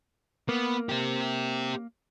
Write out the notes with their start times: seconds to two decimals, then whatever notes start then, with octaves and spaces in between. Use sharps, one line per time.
0.49 A#3 B3
0.89 C4 G4